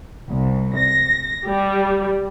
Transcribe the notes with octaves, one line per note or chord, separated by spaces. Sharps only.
C2
A#6
G3